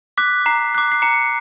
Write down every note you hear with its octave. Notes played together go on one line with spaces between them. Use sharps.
D6 F#6 B6
A#5 C7
D6 F#6
C7
A#5 C#7